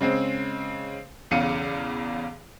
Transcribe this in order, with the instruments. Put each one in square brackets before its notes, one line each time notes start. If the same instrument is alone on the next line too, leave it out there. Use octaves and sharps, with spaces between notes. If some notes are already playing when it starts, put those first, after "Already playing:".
[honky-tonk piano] C#3 G#3 C4
B1 E2 C#3 F5 C#7 D#7